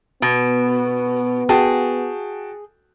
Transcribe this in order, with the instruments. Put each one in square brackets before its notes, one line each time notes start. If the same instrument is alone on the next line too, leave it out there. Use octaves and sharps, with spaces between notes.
[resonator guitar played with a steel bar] B2 [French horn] B3
[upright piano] F#4 G5 A5 [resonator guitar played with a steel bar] G#4